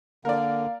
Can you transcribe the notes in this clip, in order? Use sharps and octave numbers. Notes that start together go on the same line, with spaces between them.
D3 A#3 A#4 D5 F5